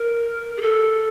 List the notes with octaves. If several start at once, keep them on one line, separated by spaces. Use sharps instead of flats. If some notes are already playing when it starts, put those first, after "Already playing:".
Already playing: A#4
G#4
A4